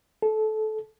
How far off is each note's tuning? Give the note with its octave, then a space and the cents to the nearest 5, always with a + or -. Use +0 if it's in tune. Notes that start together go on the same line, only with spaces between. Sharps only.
A4 -20